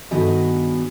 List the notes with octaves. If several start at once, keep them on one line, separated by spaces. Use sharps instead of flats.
G2 D#3 B3 F#4 G#4 D#5